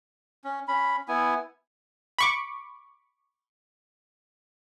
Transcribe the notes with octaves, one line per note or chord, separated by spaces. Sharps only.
C#4
C#4 B5
B3 E4 G#5
B5 C#6 D6